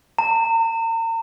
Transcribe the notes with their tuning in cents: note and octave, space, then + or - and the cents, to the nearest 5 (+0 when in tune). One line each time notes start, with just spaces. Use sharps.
A#5 -40